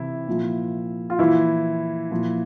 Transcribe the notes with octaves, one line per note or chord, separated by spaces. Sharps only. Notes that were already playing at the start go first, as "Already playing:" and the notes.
Already playing: C3 E3 E4
A#2 F3
F4
A#2 E3 F3 E4
A#2 F3